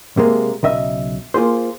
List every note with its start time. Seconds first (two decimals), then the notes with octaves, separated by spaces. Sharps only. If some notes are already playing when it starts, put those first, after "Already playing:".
0.17 C3 G#3 A#3
0.63 B1 C#3 D#5 E5
1.34 A#3 F4 G#4 C5